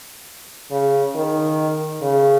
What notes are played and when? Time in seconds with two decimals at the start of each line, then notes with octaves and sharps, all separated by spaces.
0.71 C#3
1.16 D#3
2.02 C#3